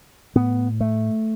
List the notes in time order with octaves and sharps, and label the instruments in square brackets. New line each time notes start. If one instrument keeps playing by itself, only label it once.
[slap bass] A2 B3
A3